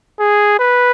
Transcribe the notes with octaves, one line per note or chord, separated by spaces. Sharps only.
G#4
B4